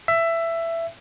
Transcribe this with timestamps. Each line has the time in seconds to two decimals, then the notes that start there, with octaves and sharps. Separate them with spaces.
0.08 E5